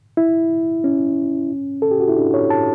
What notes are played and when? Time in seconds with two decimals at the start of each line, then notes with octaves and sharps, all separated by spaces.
0.17 E4
0.84 C#4
1.82 A4
1.91 G4
2.00 F#4
2.08 E4
2.17 D4
2.34 C#5
2.50 A5